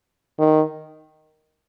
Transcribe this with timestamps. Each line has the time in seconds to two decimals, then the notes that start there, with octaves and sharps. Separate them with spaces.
0.39 D#3